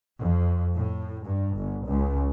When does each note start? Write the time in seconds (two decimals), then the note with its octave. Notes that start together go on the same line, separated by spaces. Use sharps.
0.20 F2
0.75 A2
1.25 G2
1.57 G1
1.86 C#2